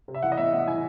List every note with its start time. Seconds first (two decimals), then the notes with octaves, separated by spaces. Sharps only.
0.08 C3
0.15 E5
0.22 E3 F#5
0.32 D#5
0.37 A2 E5
0.53 A2 F#5
0.68 E3 G#5